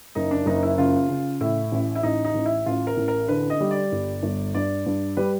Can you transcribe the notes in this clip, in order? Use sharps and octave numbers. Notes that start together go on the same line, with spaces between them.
F#1 D#4
D4
F#1 D#4
E4
C#3 F4
C#3
A2 E4
A1
E4
A1 D#4
D#4
A1
E4
A1 F4
A#4
A1
A#4
D3 B4
D#5
G3
D5
G1
G1
G2 D5
G2
G3 B4